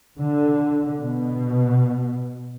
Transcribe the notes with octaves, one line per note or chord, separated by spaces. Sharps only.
D3
B2